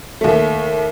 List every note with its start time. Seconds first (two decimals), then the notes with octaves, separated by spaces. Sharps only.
0.21 D#2 A3